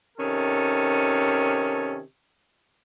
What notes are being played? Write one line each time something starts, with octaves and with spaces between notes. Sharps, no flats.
C3 D#3 C#4 A4